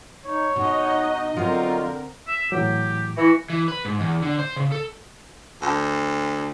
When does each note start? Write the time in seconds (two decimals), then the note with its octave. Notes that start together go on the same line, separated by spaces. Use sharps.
0.25 D#4 C#5
0.56 B2 D#4 F#4 D#5
1.37 D3 F#3 C4 F4 A#4 D#5
2.27 E5
2.52 A2 E3 F#3 G4
3.17 E3 F#4
3.50 E3
3.68 B4
3.85 G#2
4.00 E2
4.22 D3
4.39 C5
4.56 C#3
4.72 A4
5.62 D2